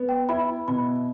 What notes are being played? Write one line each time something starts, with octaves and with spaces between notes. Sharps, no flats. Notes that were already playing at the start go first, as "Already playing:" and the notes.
Already playing: B3
G5
E4 B5
B5
B2 B5